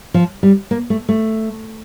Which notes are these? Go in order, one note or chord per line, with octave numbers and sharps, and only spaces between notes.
F3
G3
A#3
A3
A3